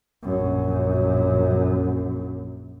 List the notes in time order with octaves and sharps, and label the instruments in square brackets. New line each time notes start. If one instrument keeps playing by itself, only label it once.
[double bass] A#1 F#2